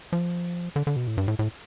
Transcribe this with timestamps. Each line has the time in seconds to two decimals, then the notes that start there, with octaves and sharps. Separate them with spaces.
0.13 F3
0.76 D3
0.87 D3
0.96 B2
1.07 A2
1.17 G2
1.28 A2
1.39 A2